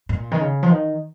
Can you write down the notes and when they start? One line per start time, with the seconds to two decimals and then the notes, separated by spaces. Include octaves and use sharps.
0.09 A#2
0.31 D#3
0.40 C#3
0.63 F3
0.70 D#3